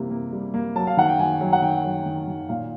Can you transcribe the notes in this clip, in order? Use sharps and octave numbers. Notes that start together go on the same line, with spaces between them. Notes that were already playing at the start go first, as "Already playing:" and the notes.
Already playing: C3 E3 G3 A#3
A#3
G3
A#3
F#3 A5
F5
D#3 F#5
G5
D#3 G#5
F#3
F#5
D#3 G5
F#3
D#3
D#3
A#2 F5